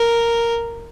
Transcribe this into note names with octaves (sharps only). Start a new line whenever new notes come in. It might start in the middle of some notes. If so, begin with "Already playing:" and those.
Already playing: A#4